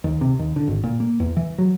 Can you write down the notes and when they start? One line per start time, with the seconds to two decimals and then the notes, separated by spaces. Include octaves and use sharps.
0.04 D#2
0.21 C3
0.39 D#2
0.56 D3
0.68 G#1
0.84 A#2
1.00 A#3
1.20 E2
1.37 E3
1.58 F#3